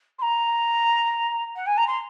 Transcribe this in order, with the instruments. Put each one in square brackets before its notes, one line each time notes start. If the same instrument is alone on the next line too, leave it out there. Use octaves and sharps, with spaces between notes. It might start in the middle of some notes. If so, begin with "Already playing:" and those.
[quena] C6
A#5
F#5
G#5
A#5
C6